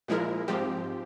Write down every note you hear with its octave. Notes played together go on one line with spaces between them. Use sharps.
A#2 F3 G#3 E4 A#4
G#2 F3 C4 G4